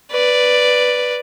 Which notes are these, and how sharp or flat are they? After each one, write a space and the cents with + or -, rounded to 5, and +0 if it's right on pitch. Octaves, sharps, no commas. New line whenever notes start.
B4 +0 D5 +0